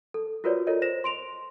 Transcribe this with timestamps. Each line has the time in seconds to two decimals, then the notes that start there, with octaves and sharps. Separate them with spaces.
0.14 A4
0.44 F4 F#4 A#4 B4 C#5 D5
0.67 F4 A4 A#4 C#5 D#5
0.82 C5 A#6 E7
1.04 C6 D7 F7